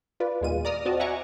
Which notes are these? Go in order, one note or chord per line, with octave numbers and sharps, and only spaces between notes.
F4 B4 D5
D#2 A#2 G#3 B3 F4 D#7
D5 A#5 D#6 F6
C4 F#4 D5 D#5 A5
E5 F#5 G#5 A#5 C#6 D6